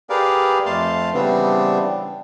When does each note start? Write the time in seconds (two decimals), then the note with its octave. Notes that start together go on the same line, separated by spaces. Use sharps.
0.10 G4 G#4 A#4 B4 D5 F5
0.66 F2 A3 F5 A5 C6
1.13 C#3 E3 G3 B3 C4 D4